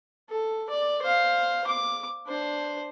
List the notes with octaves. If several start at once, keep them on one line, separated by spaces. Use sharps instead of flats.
A4
D5
C5 F5
D6
D4 C5